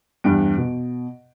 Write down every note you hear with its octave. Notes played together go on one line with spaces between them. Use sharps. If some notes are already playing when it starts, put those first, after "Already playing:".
E2 G2 G3 D7
B2